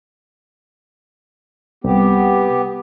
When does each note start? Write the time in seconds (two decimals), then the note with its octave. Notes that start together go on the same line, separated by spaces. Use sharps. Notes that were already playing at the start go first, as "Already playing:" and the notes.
1.84 C2 B3 G4